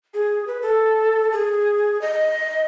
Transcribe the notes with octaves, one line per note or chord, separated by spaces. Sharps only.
G#4
B4
A4
G#4
D#5